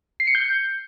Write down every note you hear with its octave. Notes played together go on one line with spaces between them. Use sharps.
C7
C#7
G6